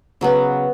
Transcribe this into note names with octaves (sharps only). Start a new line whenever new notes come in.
C#3 F#3 B3